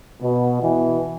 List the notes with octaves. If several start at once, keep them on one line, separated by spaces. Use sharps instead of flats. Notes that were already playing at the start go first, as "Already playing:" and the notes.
B2
B2 E3